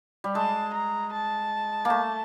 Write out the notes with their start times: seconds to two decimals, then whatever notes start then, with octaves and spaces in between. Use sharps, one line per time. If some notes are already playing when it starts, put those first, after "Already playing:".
0.24 G3
0.35 G#3 A5
0.74 A#5
1.13 A5
1.85 A3 A#3